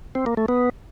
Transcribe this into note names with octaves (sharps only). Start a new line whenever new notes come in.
C4
A#3
A3
B3